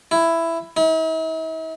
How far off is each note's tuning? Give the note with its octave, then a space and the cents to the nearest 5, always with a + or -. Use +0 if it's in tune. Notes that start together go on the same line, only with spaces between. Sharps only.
E4 +10
E4 -45